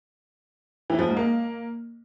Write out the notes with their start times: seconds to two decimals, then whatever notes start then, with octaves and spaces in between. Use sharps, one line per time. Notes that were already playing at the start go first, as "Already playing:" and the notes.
0.90 E3
0.99 F3
1.08 G#2
1.17 A#3